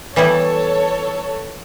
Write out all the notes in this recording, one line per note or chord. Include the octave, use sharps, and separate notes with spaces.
E3 G3 B3 E4 A4 C#5